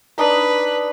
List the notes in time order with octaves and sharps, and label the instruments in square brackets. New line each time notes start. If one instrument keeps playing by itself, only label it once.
[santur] D4 D#4 B5 [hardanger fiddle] B4